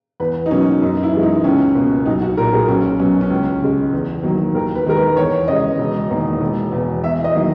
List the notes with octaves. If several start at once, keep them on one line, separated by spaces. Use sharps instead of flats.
E2 B4
D#4
B2 F#3 A#3 C#4
F#2 D#4
E4
E3 G#3
D#4
C#2 C#4
B2 A#3
B1 D#4
F#4
A#2 A#3 A#4
G#4
B1 C#4
B2 F#3 C#4
C#4
C#2
C#3 G#3
E2
D#3 F#3 A#3
D#2 A#4
B4
D#3 G#3 A#4
B4
E2 C#5
C#3 G#3 D#5
E1
E2 D#3 A#3
E1
E2 B2
E2 E5
D#5
D#3 F#3 A#3